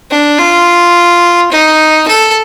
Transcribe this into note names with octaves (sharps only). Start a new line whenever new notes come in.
D4
F4
D#4
A4